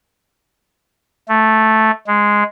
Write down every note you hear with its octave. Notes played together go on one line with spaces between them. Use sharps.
A3
G#3